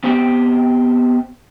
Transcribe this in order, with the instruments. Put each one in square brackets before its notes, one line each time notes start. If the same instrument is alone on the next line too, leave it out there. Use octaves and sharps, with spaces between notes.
[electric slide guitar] B3 C4 G4 G5